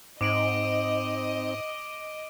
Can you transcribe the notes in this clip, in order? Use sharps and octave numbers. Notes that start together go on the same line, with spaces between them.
G#2 C4 D#4 D#5 D6 D7 F#7